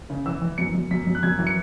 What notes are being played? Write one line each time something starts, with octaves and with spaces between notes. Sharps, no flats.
C#3
E3 E6
E3
F#2 C#7
F#2
F#2 B6
F#2
F#6
F#2 G#6
E3
C#7